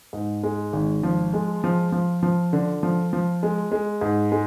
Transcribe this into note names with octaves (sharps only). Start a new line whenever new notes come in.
G#2
G#3
G#1
F3
G#3
F3
F3
F3
D3
F3
F3
G#3
G#3
G#2
G#3